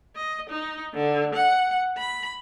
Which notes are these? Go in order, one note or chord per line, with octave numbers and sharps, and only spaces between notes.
D#5
D#4
D3
F#5
B5